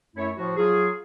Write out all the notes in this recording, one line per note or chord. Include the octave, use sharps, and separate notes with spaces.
F#2 A3 E4 C#5
A2 F3 F#4
F#3 F4 G#4